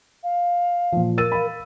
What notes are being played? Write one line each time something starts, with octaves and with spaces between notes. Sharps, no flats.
F5
A#2 F3
A#4 E6 A6 D#7
F5 B5